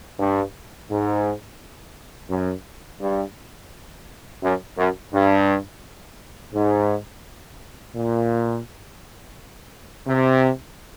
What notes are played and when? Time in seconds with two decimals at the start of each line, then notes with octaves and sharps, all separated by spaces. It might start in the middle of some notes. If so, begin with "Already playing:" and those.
0.20 G2
0.90 G#2
2.30 F#2
3.01 G2
4.43 F#2
4.78 F#2
5.14 G2
6.54 G#2
7.96 A#2
10.07 C3